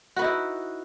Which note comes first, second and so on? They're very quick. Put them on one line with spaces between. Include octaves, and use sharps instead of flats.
F#4 B4 D#4 E4